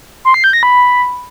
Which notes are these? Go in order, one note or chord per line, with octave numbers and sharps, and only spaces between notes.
C6
C7
G6
A#6
B5